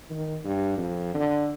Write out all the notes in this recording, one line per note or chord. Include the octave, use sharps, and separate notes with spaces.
D#3
G2
F2
D3